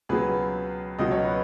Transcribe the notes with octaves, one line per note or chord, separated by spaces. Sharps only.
C#2 B2 F#3 G#4 B4
C#2 B2 F#3 D#5
C#5
B4